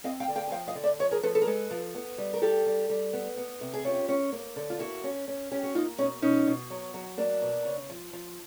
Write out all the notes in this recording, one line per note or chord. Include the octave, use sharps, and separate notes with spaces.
C4 D#5 F5
F5 G5
D3
F5 G5
G#5
F3 F5 G5
D#5 F5
D3
D5 E5
F3 C#5 D#5
G#4 A#4
F3 A4 B4
A4 B4
A#4
G#3 A4 B4
F3
B3
G3
A#4
G3 G4 A4
G3
G3
B3
B3
C3
G#4
C#4 F4 G4
C#4
A#3
D3
F4
A#3 E4 F#4
C#4
C#4
C#4 G4
F#4
A#3 D#4 F4
B2 C#4 D#4
B2 C#4 D#4
B2
F#3
F#3
A#3 D4
B2
C#3
F3
F3